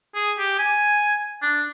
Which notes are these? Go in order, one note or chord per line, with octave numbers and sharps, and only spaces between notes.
G#4
G4
G#5
D4